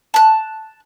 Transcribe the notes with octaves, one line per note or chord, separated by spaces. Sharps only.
A5 F#6